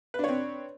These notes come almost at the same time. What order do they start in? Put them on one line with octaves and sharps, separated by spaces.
B4 D4 C#5 C4